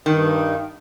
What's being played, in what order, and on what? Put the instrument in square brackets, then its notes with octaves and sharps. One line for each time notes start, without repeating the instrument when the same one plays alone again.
[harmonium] G2 D#4 [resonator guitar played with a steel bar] D#3